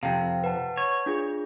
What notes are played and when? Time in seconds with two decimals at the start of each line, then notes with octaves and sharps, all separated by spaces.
0.03 F2 C3 F5
0.44 B4 F#5 A5
0.77 C#5
1.06 D4 F4 G#4